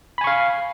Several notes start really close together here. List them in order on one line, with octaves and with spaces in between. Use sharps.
B5 G#5 C#6 F5